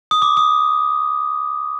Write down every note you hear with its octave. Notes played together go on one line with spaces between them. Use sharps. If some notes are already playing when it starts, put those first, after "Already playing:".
D#6
D6
D#6